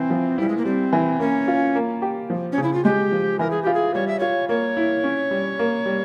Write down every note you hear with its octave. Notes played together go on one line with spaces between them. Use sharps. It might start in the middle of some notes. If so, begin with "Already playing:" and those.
Already playing: E3 C4
F3
G3 E4
G#3
A#3
G3 C4
E3
A#3 C#4
F4
A#3
G4
F3
C#4
C#3
E4
F4
G#3 G4
F3
E3 A#4
G#4
F4 G4
G#4
G3 C#5
E5
F4 C#5
A#3 C#5
E4
C#4
G3
A#3
G3